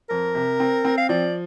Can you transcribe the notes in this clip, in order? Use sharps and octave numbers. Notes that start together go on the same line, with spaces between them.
F2 A#4
C3
C4
C4
F5
F3 D5